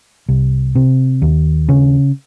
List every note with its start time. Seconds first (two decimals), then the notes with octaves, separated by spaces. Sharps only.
0.29 C2
0.75 C3
1.22 D#2
1.69 C#3